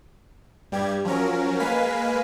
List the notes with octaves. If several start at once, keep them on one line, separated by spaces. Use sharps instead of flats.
G2 G3 G4 G#6
F3 F#3 C#4 A#4
G#3 A#3 B4 F5 G#5 B6